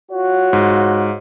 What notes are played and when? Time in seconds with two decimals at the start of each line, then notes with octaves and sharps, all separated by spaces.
0.12 F4 F#4 C#5
0.53 G#2